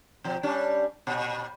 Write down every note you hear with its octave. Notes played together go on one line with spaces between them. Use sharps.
B2 F3
G3 C#4 D4
A#2